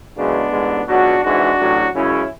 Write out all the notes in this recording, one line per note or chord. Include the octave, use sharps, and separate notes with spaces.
F#2 C#3 E3 G#3 B3 D4
A1 G#2 G#3
C#2 B2 F#3 D4 F#4
G#1 G#2 E3 G#3 D4 F#4
A1 A2 F#3
F#2 C#3 G#3 C#4 E4